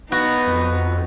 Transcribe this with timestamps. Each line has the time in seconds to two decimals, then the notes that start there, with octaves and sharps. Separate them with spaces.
0.12 B3 D#4 F#4
0.47 F2